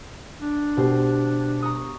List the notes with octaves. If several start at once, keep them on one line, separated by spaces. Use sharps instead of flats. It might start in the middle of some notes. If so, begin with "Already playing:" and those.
D4
B2 G4 C5
A#5 C#6 D#6